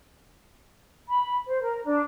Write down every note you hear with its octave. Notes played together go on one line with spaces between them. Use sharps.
B5
C5
A#4
D4